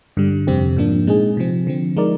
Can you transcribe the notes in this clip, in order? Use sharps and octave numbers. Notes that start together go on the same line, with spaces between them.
G2 D3 G3
F2 C3 G3 C4 G4
G#2 F3 A#3 D4
A#2 G#3 C4 D#4 G#4
C3 F3 C4
D3 F3 C4
F3 G#3 D#4 A#4 D5